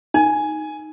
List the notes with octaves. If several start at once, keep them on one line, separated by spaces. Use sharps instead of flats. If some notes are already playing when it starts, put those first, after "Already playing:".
D#4 G#5